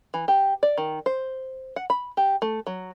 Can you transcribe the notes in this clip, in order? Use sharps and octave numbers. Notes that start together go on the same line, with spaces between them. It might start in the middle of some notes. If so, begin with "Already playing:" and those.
E3
G4
D5
D#3
C5
F#5
B5
G4
A3
F#3